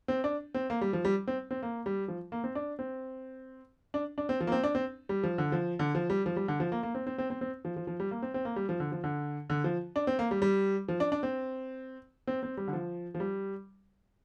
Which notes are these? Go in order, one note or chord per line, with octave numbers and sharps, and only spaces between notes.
C4
D4
C4
A#3
G3
F3
G3
C4
C4
A#3
G3
F3
A#3
C4
D4
C4
D4
D4
C4
F3
A#3
C4
D4
C4
G3
F3
D3
F3
D3
F3
G3
F3
G3
D3
F3
A#3
A#3
C4
C4
C4
C4
C4
F3
F3
F3
G3
A#3
C4
C4
A#3
G3
F3
D3
F3
D3
D3
F3
D4
C4
A#3
G3
G3
F3
D4
D4
C4
C4
C4
G3
D3
F3
F3
G3